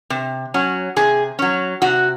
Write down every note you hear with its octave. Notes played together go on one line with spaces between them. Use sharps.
C3
F#3 C#4
C3 G#4
F#3 C#4
C3 F#4